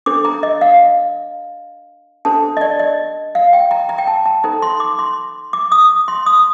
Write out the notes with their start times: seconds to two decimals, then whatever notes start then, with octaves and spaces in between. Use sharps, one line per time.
0.06 D4 A4 C5 D6
0.25 A#5
0.43 D#5
0.61 F5
2.25 D4 A4 C5 A5
2.57 D#5
2.61 D5
2.79 D#5
3.35 F5
3.53 G5
3.71 A#5
3.89 A#5
3.98 G5
4.07 A5
4.26 A5
4.44 D#4 A4 C5 A#5
4.62 C6
4.80 D6
4.99 C6
5.53 D6
5.72 D#6
6.08 C6
6.26 D#6